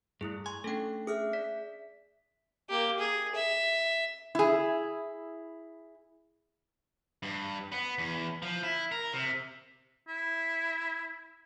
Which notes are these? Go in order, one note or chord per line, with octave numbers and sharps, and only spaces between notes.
G2 A3 E4 G#4
G#5 C6 C#6
A3 C#4 D4 A4 G5
G#4 E5 D#6 F6 F#6
D5 B6
A#3 G4
G#4
E5
E4 G#4
G2
B3
E2
F3
E4
A#4
C3
E4